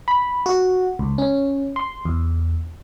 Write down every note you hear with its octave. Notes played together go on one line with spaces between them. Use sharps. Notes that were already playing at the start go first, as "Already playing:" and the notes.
B5
F#4
C#2
C#4
C6
E2